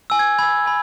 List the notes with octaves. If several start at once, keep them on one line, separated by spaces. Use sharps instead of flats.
G#5 E6
G#6
B5 E6 G#6
G#5 B5